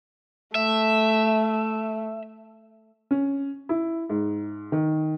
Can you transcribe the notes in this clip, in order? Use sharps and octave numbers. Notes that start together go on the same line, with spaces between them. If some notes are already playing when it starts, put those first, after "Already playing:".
A3 E5
C#4
E4
G#2
D#3